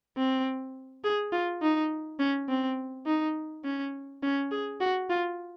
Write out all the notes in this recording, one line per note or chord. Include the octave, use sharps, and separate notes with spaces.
C4
G#4
F4
D#4
C#4
C4
D#4
C#4
C#4
G#4
F#4
F4